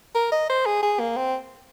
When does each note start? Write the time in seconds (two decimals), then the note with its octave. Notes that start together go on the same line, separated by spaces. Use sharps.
0.15 A#4
0.32 D#5
0.49 C5
0.66 G#4
0.83 G#4
1.00 A#3
1.17 C4